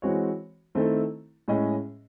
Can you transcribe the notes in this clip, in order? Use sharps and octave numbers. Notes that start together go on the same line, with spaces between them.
E3 G#3 C4 F#4 C#5
D#3 A3 C4 E4 A4
A2 G#3 C#4 G#4 D#5